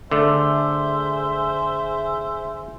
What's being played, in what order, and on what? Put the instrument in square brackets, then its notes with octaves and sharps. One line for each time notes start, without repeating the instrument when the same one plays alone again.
[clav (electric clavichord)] D3 A3 [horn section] G#4 C5 E5